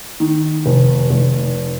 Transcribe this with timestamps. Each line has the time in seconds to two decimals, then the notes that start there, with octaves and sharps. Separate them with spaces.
0.20 D#3
0.66 F1
1.11 F1